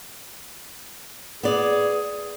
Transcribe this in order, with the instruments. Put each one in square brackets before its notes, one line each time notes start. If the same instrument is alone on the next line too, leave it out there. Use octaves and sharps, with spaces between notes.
[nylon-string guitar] B3 D5 [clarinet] G#4